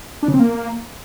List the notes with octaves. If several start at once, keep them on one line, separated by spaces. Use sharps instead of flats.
D4
C#3
C4
A#3